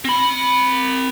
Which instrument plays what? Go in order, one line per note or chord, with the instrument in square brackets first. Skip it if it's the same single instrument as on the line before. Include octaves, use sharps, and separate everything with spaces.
[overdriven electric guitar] C4 B5